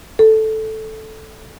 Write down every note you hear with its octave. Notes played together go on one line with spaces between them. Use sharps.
A4